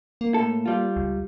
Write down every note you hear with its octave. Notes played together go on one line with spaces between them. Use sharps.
A#3
A2 A4
G3 F4
C#2